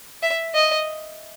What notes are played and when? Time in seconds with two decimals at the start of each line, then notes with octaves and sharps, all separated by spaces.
0.23 E5
0.55 D#5